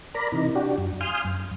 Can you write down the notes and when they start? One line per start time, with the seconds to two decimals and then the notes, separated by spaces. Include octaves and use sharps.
0.14 A#4 D5 A#5 B5
0.32 C3 E3 D#4
0.55 D4 F#4 G4
0.78 F#2
1.01 F5 G#5 C6 D#6 F6 G6
1.25 F#2